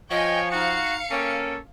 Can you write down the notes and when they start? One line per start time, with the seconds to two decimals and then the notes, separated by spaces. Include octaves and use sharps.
0.11 F3 C#5 D#5 G5 G#5
0.52 D#4 F#4 F5 C#7
1.11 A#3 C#4 A4 G5